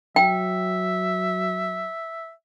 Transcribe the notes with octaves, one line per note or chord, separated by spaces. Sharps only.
F#3 E5 G5